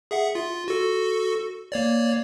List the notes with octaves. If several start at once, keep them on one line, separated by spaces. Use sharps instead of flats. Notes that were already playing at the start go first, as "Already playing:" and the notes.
G#4 E5 F#5
F4
F#4 A4
A#3 C#5 D5